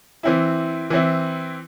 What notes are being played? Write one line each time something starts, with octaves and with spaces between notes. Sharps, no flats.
E3 C4 E4
E3 C4 E4